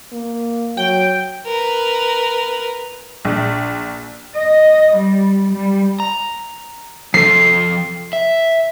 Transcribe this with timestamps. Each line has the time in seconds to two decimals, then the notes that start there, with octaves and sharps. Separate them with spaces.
0.13 A#3
0.77 F#3 G5
1.46 A#4 B4
3.25 A#1
4.35 D#5
4.95 G3
5.53 G3
6.00 A#5
7.14 F3 A4 C7
8.13 E5